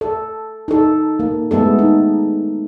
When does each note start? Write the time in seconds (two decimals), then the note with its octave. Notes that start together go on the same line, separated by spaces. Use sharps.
0.01 A4
0.68 D#4 A4
1.20 A#3
1.51 G#3 A3 B3 A4
1.79 D#4